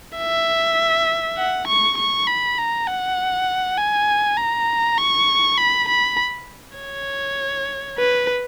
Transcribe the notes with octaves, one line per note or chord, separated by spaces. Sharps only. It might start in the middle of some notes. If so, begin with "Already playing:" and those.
E5
F#5
C#6
C#6
B5
A#5
F#5
G#5
A#5
C#6
B5
B5
C#5
B4